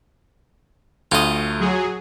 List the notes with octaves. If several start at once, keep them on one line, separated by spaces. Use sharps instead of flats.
D2 A3 F4 D#5
F#3 G#4